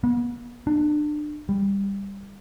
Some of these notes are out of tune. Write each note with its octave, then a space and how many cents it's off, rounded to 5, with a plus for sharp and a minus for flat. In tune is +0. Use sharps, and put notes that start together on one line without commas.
B3 -40
D4 +30
G3 +15